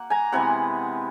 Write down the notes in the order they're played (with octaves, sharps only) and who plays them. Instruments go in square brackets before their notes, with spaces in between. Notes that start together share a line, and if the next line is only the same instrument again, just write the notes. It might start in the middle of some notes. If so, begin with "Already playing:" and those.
Already playing: [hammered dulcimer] A#3 F#5
G#5 A#5
C3 E3 G#3 B3 F#5 G#5